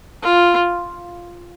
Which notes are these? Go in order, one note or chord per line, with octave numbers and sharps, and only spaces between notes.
F4